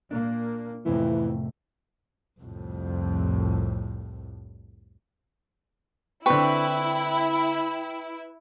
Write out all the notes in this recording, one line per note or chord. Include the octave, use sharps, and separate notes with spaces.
A#2 A#3 D4
F2 A2 C3 E3 A3
C2 F2 A2
D3 C4 E4 B4 G5 C#6